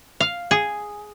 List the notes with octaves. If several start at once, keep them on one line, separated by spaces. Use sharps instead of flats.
F5
G#4